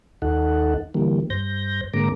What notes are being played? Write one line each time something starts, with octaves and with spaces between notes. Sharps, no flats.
D#2 D#4 A4 F#5
D3 E3 G3 A#3
G2 C5 G6 A#6
G#2 D3 G#3 A#3 A#5 D6